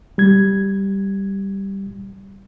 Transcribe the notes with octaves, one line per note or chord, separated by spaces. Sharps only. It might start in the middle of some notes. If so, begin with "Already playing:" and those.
G3 G#6